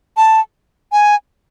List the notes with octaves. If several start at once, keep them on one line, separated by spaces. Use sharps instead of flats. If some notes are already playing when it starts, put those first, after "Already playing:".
A5
G#5